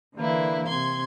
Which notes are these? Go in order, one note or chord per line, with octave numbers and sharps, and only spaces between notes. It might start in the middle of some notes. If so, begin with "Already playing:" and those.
D3 E3 A#3 E4 B4
C3 C6 G#6